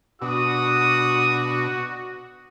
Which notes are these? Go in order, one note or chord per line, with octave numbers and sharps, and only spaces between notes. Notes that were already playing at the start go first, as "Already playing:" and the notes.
B2 D4 F#4 D#6